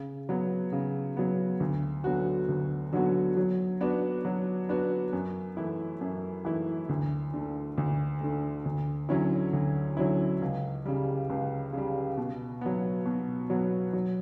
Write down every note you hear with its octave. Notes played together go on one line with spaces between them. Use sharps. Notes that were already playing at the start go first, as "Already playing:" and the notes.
Already playing: C#3
F#3 B3
C#3
F#3 B3
D2
D3 F#3 B3 F#4
D2
D3 F#3 B3 F#4
F#3
B3 D4 F#4 B4
F#3
B3 D4 F#4 B4
F#2
E3 A3 E4
F#2
E3 A3 E4
D2
D3 A3
D2
D3 A3
D2
D3 F#3 C#4 E4
D2
D3 F#3 C#4 E4
C#2
C#3 G3
C#2
C#3 G3
B2
F#3 B3
B2
F#3 B3
F#3